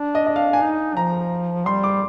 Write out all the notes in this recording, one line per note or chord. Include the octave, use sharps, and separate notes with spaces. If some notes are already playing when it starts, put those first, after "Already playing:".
Already playing: D4
D#5
D#5
F5
G#5
D#4
F3 A#5
G3 C6
D6